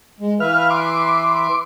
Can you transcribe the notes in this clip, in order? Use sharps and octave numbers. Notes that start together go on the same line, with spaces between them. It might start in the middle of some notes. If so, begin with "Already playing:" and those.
G#3
E3 B4 E5 F5 F6
C6 D6